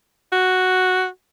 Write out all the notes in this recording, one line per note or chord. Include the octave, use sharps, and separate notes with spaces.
F#4